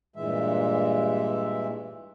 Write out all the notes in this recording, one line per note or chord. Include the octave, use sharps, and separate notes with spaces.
G2 A#2 E3 G#3 E5